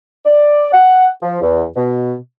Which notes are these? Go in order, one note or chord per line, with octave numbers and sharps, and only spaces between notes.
D5
F#5
F3
E2
B2